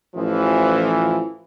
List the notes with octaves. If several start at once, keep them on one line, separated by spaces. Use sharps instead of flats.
A1 E3 F3